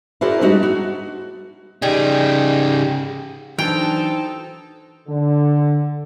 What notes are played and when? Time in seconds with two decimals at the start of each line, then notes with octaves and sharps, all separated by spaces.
0.21 E4 F#4 G#4 A#4 C5 D5
0.41 G3 G#3 D4 D#4 F#4
0.63 F#4
1.82 C#3 G3 D#4 G#4
3.59 E3 F#3 D4 D#4 A4 C5 G5
5.07 D3